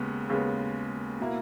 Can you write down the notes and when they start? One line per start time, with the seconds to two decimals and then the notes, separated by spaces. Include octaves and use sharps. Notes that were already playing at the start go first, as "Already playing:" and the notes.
Already playing: D#2 C#3 G#3 B3
0.29 D#2 C#3 G#3 B3
1.21 B2 A#3 E4